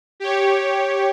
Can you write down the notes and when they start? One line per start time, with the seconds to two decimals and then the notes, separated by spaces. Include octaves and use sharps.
0.20 G4 C#5